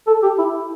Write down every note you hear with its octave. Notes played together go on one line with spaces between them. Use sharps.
A4
G4
E4